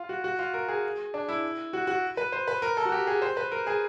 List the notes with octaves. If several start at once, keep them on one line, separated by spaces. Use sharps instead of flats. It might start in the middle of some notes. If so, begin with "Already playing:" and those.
Already playing: F4
F#4
F#4
F4
A#4
G#4
D4
E4
F#4
F#4
B4
C5
B4
A#4
A4
F#4
G4
G#4
C5
B4
A#4
G#4